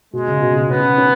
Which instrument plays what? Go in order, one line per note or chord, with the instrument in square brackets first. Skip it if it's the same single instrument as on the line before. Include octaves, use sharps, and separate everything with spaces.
[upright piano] B2 [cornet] G#3
[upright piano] C#3
B2
B2
[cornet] B3 [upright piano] C#4
[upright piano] C#4